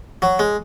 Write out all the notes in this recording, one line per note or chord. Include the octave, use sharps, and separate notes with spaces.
F#3
G#3